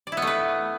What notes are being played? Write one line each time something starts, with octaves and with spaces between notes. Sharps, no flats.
D5
E4
B3
A3
B4